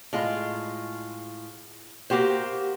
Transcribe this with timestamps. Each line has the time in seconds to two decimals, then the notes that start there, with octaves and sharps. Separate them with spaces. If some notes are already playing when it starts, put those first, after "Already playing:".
0.13 A2 G#3 F4
2.10 A#3 F#4 G4 C5